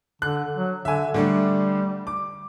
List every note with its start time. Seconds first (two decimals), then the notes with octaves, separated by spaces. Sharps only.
0.22 D3 F#6
0.56 F#3
0.85 D3 E5 G#5
1.14 D3 G3 A3 D4
2.07 D6